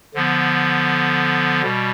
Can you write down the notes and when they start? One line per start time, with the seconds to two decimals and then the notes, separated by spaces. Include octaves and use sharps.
0.14 D3 F3 B3
1.63 B2 G3